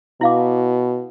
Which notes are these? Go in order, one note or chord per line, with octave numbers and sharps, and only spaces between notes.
B2 E4 F5 D6